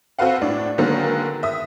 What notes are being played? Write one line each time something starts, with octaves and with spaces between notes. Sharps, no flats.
C4 F#4 A4 B4 F5 F#5
A2 D4
D3 D#3 F#3 G#3 A#3 B3
E5 D#6